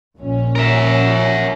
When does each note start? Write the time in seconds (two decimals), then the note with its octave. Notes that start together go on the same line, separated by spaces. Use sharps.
0.16 A#1 C#4
0.55 A#4 E5